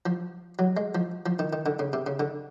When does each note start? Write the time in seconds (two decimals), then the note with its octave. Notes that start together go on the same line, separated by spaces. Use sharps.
0.06 F3
0.59 F#3
0.77 G#3
0.95 F3
1.26 F3
1.39 D#3
1.53 D#3
1.66 D3
1.79 C#3
1.93 C3
2.07 C#3
2.20 D3